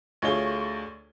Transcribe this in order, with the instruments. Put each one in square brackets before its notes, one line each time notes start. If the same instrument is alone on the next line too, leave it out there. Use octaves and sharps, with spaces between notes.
[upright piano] D2 A3 F4 G#4 C#5 G7